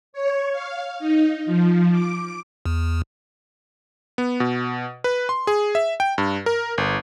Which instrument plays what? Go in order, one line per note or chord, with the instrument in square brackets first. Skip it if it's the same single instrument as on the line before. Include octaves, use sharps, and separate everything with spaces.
[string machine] C#5
F5
D#4
F3
D6
[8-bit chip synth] E2
[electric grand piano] B3
B2
B4
C6
G#4
E5
G5
G2
A#4
G1